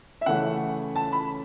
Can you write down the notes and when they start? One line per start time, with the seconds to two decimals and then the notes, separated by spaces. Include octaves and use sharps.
0.21 E5
0.26 C#3 E3 A3 C#4 F#5
0.96 A5
1.12 B5